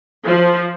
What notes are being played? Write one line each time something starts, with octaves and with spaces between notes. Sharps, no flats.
F3